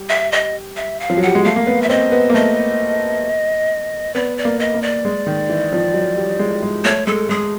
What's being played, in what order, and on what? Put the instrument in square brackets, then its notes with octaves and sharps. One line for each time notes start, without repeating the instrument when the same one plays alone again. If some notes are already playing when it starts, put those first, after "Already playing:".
Already playing: [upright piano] G3
[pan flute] E5
D#5
E5
F5
[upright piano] F3
F#3
[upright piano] G3 [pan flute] F#5
[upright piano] G#3
[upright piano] A3 [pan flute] F5
[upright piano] A#3
B3
[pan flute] E5
[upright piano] C4 [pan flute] D#5
[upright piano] B3
A#3
[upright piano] A3 [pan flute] D#5
[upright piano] B3 [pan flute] D5
[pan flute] D5
[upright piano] A#3
[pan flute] D#5
[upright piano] A#3
[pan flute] D5
[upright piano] G#3
D#3
E3
F3
F#3
G3
G#3
G#3
[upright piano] A3 [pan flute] C#5
[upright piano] G#3 [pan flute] A4
[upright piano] G#3 [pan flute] G#4